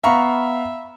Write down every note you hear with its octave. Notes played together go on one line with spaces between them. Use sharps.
B3 E5 F5 A#5 B5 C#6